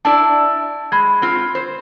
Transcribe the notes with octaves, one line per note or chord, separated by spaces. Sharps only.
D4 E4 D5 A5
G#3 B5 G#6
C4 F4
C5